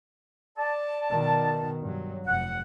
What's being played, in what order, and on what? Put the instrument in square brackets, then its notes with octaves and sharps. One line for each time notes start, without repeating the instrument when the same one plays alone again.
[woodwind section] D5 A5
[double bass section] B2 D#3
G2 F#3
[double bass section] F1 [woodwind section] F#5